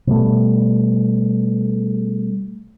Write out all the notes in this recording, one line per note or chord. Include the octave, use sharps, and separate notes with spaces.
B2 G3 A3